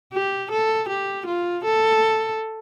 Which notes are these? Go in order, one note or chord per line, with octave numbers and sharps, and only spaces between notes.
G4
A4
G4
F4
A4